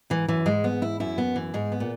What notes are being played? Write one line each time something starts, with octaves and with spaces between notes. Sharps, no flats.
G#2 E3
F#2 E3
G#2 G#3
B3
E4
F#2 E4
B3
E3
G#2 G#3
B3
A#2